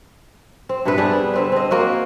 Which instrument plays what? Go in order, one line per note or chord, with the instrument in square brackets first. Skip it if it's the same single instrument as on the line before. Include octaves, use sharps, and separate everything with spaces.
[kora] C4
G2 C3 B3 B4
G3 D4 G#4
D3 C4 B4
C4 D#5
A#3 C4 F#4